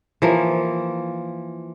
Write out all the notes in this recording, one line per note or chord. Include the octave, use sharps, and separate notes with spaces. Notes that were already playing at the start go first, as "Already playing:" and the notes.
E3 F3 A#3